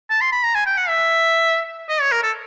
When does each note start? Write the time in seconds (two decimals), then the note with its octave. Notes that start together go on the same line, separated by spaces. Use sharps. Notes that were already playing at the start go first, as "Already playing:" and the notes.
0.10 A5
0.21 C6
0.32 B5
0.44 A#5
0.55 G#5
0.67 G5
0.77 F#5
0.88 E5
1.90 D#5
2.01 C#5
2.12 A#4
2.23 A4